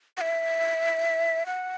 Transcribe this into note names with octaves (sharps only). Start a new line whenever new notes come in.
F#5
E5
F#5